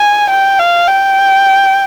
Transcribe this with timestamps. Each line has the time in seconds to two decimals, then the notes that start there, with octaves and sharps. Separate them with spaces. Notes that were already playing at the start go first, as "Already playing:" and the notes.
Already playing: G#5
0.30 G5
0.59 F5
0.87 G5